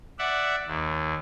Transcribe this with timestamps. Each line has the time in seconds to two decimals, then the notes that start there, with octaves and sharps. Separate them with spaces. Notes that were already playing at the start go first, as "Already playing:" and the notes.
0.19 D5 E5 F#5
0.67 D#2